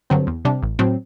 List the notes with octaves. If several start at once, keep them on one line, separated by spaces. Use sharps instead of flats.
G2 D3 F#3 C4
E2
C3 G3 D4
A1
A2 F#3 C4